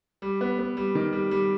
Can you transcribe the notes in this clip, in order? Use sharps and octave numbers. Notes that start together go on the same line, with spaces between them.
G3
B3
B3
G3
D#3
G3
G3